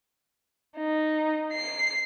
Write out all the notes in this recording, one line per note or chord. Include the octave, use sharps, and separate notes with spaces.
D#4
C7